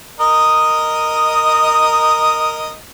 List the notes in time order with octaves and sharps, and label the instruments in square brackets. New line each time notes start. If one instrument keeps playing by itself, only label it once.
[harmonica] A#4 D#5 D#6